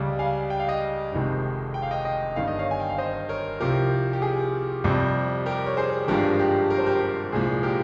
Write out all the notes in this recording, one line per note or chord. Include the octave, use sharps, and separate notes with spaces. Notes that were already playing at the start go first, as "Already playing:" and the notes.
Already playing: C#2 C#3 G3
F5 G#5
G5
F5
D#5 G5
F1 F2 C3 D#3 G#3
G5
F5
D#5 G5
D#5 G5
G1 G2 D#3 F5
D#5
C#5 F5
G#5
G5
F5
C5 D#5
A#4 C#5
C2 C3 F3 G4 A#4
G4
G#4
F2 C3 G3
G4 A#4
C#5
G#4 C5
G#1 G2 F3 G#3 G4 A#4
G4
A#4
C5
G4 A#4
G4
C2 A#2 F3 G#3 G#4
G4 A#4